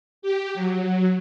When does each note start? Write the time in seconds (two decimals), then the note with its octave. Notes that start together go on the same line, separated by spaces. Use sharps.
0.22 G4
0.54 F#3